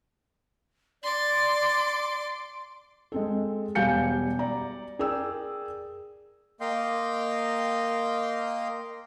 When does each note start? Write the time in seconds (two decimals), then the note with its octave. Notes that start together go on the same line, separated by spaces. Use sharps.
1.03 D5 C6 D6
3.12 G#3 C4 A4
3.75 E1 G3 F5 G#5 G6 C#7
4.39 D5 A#5
4.99 G#4 A#4 D5 G5 E6
6.61 A#3 D#5 F5 G5 C6 G6